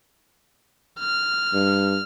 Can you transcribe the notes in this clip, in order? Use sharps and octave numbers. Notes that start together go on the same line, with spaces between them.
F6
G2